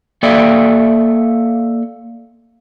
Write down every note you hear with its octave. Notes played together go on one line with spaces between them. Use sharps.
A#3 A4 D5 E5